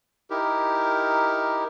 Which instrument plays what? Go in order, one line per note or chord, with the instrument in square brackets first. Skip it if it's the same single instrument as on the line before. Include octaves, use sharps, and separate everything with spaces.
[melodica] D#4 E4 G4 A#4